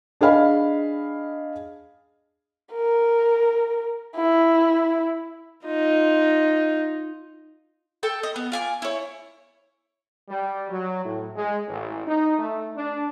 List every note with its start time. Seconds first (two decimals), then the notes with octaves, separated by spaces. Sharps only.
0.21 D4 G#4 D#5 F5 B5
2.73 A#4
4.16 E4
5.66 D#4 F4
8.03 A4 G5 E6
8.23 D#5
8.36 B3
8.52 F4 G#5 D6
8.82 E4 C#5
10.29 G3
10.70 F#3
11.04 A2
11.36 G#3
11.68 A1
12.08 D#4
12.39 A3
12.77 D4